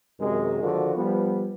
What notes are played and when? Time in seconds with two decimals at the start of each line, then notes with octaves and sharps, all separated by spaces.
0.19 F#2 C3 D#3 G#3
0.61 D3 D#3 F3 F4 F#4
0.95 F3 G3 B3